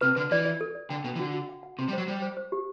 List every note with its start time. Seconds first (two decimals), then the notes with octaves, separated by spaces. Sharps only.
0.01 C3 B4
0.16 D3 B4
0.31 E3 D5
0.45 D5
0.61 A4
0.75 D5
0.90 D3 G5
1.04 B2 G5
1.16 E3
1.19 D3 F#4
1.34 F#4
1.49 F#5
1.63 F#5
1.79 C3 C6
1.88 G3
1.93 F#3 C5
2.08 G3 C5
2.22 C5
2.37 C5
2.52 G4